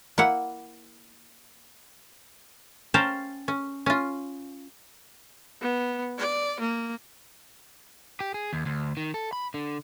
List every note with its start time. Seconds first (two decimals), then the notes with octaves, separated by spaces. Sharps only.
0.18 A#3 E4 F#5
2.94 C#4 C5 F5 G5 A5 A#5
3.48 C#4
3.86 C#4 F4
5.61 B3
6.18 D5
6.60 A#3
8.21 G4
8.34 G#4
8.53 D#2
8.66 D2
8.97 D#3
9.14 A4
9.33 B5
9.54 D3